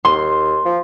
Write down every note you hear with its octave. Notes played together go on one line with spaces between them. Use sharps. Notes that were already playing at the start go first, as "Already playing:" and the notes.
D#2 C6
F3